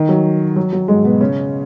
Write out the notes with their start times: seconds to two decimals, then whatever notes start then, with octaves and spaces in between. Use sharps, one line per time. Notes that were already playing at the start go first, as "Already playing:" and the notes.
Already playing: D#3
0.09 F#3
0.56 F#3
0.73 F#3
0.88 G#2 G#3
1.04 B2 B3
1.21 C#3 C#4